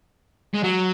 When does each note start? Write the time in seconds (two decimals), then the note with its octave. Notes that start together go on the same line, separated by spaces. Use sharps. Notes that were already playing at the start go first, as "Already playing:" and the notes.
0.54 G#3
0.64 F#3